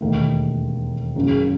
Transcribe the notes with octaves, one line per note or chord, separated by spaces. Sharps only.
E1 D#2 D#3 A3
F#1 F#2 C#3